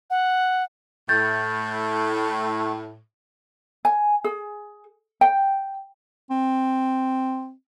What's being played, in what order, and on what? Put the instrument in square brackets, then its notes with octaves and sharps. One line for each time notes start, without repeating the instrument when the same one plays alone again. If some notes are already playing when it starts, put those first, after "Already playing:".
[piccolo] F#5
[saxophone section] A2 [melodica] A3 [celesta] G6 A6
[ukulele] G#5
G#4
G5
[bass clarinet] C4